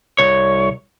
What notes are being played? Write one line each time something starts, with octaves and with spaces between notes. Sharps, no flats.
C2 C#5